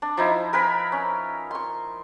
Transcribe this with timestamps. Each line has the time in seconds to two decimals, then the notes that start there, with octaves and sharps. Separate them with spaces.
0.02 D4
0.17 F3 D#4 E4
0.53 A#4 B4 G#5 B5
0.92 C#4
1.51 C6 C#6